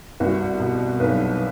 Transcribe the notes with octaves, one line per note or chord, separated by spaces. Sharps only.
C2 F#4
B2
B1 B4